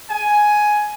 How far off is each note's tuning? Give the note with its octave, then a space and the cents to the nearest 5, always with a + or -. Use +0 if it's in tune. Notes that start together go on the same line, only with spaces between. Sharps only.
G#5 +10